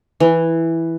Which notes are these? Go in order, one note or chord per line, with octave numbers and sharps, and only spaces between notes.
E3